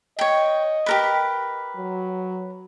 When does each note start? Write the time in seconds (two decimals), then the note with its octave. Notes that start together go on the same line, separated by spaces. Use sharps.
0.19 C#5 D#5 G5
0.86 G4 A#4 B4
1.76 F#3